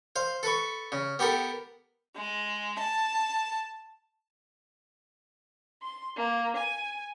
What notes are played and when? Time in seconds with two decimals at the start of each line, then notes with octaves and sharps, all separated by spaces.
0.16 C5 F5
0.43 A4 B4 C#6
0.92 C#3
1.19 B3 G4 A4 A#4
2.16 G#3
2.80 A5
5.81 C6
6.16 A#3
6.56 G#5